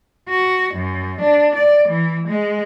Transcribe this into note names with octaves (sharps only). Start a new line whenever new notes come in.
F#4
F#2
D4
D5
E3
G#3